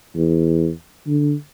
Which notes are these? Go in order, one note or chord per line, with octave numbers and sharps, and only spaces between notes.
E2
D3